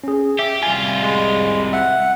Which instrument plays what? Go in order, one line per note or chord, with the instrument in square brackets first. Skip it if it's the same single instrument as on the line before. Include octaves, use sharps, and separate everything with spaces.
[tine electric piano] C#4 G#4
[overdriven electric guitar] G4 [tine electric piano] E5
[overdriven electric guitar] C2 F4 [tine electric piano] G#5
[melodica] G#3
[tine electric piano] E5 [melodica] F#5